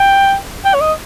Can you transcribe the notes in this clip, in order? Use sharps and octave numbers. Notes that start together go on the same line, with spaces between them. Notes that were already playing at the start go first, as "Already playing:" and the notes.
Already playing: G5
G5
C#5
D#5